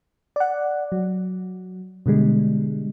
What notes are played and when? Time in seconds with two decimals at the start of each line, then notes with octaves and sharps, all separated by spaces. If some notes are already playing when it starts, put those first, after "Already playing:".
0.36 D5 F#5
0.92 F#3
2.06 B2 D3 G3 G#3